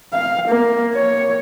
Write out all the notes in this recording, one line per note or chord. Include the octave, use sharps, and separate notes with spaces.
F5
A#3
C#5